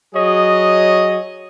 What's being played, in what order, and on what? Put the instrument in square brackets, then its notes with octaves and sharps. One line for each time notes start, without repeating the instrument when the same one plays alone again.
[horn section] F#3 G#4 C#5 D#5